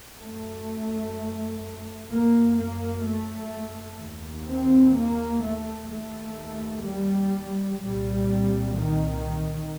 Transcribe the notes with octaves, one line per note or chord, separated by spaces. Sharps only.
F#2 A3
F#2 A#3
A#3
A3
D#2
C4
A#3
A3
D#2 A3
G3
C2 A#2 G3
D#3